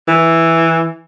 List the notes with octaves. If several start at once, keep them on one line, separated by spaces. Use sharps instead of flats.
E3